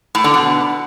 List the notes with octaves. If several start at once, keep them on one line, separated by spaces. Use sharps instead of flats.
A2
D3
B2